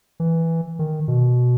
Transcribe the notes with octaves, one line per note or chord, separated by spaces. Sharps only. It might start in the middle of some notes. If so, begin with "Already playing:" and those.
E3
D#3
B2